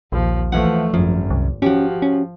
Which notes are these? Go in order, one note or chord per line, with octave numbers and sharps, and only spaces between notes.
A#1 D#2 F3
E3 F3 A3 F#5
G#1 F#2 F3
C2
F3 C#4 F#4 G4
C#4